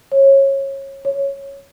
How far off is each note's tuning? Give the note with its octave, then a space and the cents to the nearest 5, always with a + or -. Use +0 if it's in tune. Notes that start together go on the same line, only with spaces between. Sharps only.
C#5 -20
C#5 -5